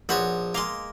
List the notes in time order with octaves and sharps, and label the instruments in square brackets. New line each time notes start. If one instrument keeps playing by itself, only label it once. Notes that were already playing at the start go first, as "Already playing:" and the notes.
[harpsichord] A#1 C5 C#5 [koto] B3 F#4
[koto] G#3 D#5 F5 [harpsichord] A#3 C6